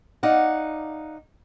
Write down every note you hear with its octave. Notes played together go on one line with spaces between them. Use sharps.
D#4 D5 F5 F#5